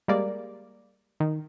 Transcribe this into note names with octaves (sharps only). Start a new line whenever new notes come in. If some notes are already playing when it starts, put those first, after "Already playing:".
G3 G#3 A#3 D5
D#3